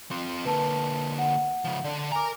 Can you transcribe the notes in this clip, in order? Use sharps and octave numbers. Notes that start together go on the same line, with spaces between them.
C4 F4
D3 A#3 B4 A5
F#5
C#3 F3
D3 D4 D5
A#4 G#5 A#5 D6